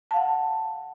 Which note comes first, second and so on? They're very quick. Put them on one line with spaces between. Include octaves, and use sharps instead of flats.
A5 F5 F#5